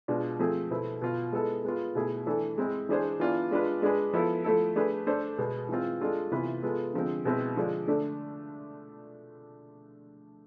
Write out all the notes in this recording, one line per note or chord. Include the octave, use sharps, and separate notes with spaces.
B2 G#3 D4 F4
F3 A3 C4 G#4
B2 B3 E4 A4 C5
B2 B3 F4
G#3 B3 E4 A4
G#3 B3 F4
B2 A3 E4 G#4
E3 A3 D4 A4
G#3 C4 E4
E3 G#3 D4 G#4 C5
E3 B3 D4 F4
G#3 D4 F4 B4
G#3 D4 G#4 B4
F3 B3 E4 A4
F3 A3 E4 A4
A3 D4 G#4 B4
A3 D4 A4 C5
B2 G#3 B3
E3 G#3 C4 F4
G#3 D4 F4 A4
C3 E3 B3 F4 B4
G#3 B3 F4 A4
D3 F3 G#3 C4
B2 G#3 C4 E4 B4
D3 F3 G#3 D4
D3 A3 D4